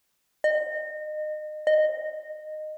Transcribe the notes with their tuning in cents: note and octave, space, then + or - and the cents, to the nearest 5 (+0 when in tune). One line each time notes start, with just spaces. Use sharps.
D#5 -30
D#5 -15